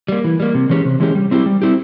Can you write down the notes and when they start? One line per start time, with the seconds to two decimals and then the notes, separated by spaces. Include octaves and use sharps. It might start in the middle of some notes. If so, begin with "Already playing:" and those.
0.08 G3 A#3
0.24 E3
0.40 G3 A#3
0.54 C3
0.70 E3 G#3 C#4 G4
0.85 C3
1.00 E3 G#3 C#4 G4
1.15 G3
1.31 C4 E4 G4
1.46 G3
1.62 C4 E4 G4